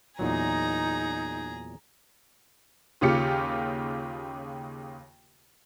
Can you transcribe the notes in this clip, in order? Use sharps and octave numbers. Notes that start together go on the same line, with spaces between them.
E2 A#2 F#3 D#4 G#4 A#5
D#2 C#3 F4 G4 C#7